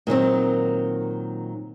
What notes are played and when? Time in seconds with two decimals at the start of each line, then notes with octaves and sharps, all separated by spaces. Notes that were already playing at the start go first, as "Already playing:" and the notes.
0.07 A#2 D#3 F#3 C4